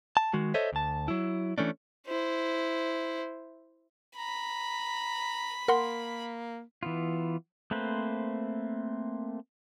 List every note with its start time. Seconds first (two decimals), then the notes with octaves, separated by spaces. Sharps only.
0.17 A5
0.34 D#3 G#3 F#4
0.54 A4 C5 C#5 D#5 E5
0.73 D2 A5
1.08 F#3 E4
1.58 E3 A3 C#4 D4
2.07 E4 C5
4.17 A#5 B5
5.68 A#3 A#4 F#5 C6
6.83 E3 B3 F4
7.71 A3 A#3 C4 B4 C5